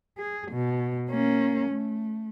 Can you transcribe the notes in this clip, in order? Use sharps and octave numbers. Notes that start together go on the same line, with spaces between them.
G#4
B2
A#3 C#4
A3